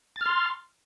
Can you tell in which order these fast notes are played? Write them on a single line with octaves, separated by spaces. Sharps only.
A6 F6 C6